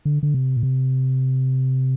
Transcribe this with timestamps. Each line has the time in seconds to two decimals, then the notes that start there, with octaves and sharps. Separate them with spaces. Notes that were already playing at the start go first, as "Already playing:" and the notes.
0.05 D3
0.23 D3
0.34 C3
0.57 A#2
0.63 C3